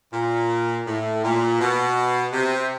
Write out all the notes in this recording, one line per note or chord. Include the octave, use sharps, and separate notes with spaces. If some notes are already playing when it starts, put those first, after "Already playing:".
A#2
A2
A#2
B2
C3